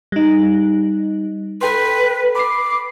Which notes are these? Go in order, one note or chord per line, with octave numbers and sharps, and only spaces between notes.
G3 D#4
A4 B4 G5 C6
B5 D6 C7